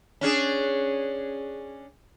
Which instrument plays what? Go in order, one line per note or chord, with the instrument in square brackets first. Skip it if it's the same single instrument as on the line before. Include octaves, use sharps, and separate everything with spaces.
[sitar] C#4 D4 G#4